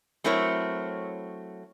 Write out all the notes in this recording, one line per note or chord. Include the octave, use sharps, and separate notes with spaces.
F#3 A3 C4 E4 A#4 C#5